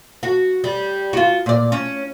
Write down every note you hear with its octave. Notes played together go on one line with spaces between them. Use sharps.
F#4
G3
F4 F#4
A#2 D5
C#4